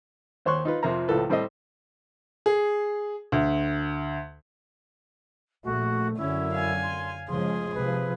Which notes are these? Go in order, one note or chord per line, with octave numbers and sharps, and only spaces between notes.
D#2 C5 C#5 C6 C#6 F#6
D#4 F4 B4
F2 C3 F3 C4 A#4 A#5
C#2 A2 F3 A4 B4
A2 G3 C4 A4 C5 D#5
G#4
D2
A#1 A3 F#4
F#2 D3 C#4 E4
F5 G#5
C6
C#3 F3 G#3 G#4 C6
C3 F3 B4